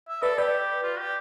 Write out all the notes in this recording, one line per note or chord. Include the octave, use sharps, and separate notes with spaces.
E5
A4 B4 D5
G4 B4 D5
F4
G4